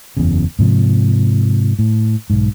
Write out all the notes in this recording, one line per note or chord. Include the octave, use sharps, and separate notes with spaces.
F#1 E2 C#3
G#2 C3 F3
A2
B1 G#2